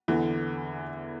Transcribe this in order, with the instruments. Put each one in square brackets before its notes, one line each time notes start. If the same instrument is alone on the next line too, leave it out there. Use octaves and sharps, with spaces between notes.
[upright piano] E2 D3 E3